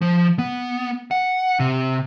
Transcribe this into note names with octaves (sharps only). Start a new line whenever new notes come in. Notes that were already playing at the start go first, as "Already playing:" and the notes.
F3
B3
F#5
C3